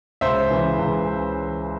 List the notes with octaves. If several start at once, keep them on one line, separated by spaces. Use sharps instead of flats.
C#2 C5 E5
C#3 E3
C#2
E3